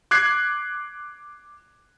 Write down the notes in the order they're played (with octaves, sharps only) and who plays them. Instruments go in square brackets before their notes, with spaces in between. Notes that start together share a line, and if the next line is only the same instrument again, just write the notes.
[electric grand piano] D6 F#6 G#6 C7